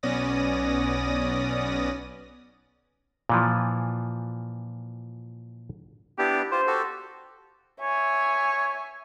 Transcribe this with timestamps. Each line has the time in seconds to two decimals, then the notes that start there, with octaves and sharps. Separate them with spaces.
0.03 B1 B3 C#4 D5 D#6 A#6
3.29 A#2 E3 F3
6.18 B3 D4 E4 G4
6.52 F4 G4 C5
6.67 F#4 G4 A4
7.81 C#5 E5 G#5